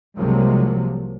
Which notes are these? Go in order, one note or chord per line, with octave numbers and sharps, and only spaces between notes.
C2 C3 F3 F#3 G#3 A#3